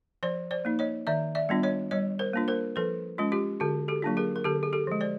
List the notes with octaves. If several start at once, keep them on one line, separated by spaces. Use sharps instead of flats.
F3 C5 D5
C5 D5
A#3 D#4
C#5 D#5
D#3 D5 E5
D5 E5
G3 B3 D4 F4
C#5 D#5
G3 C#5 D#5
A#4 C5
A#3 D4 F4
A#4 C5
F3 A4 B4
G#3 C#4 F4
F4 G4
D3 F#4 G#4
G4 A4
F#3 A#3 D4 F4
G#4 A#4
A#4
D3 G4 A4
G#4
G4 A4
F3 G#3
C5 D5